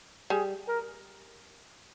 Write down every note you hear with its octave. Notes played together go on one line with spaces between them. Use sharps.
G3 G#4
A#4